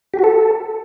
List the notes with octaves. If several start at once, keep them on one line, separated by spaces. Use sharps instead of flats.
G4
F#4
A4